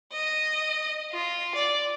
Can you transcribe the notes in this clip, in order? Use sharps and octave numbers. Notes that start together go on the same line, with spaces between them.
D#5
F4
D5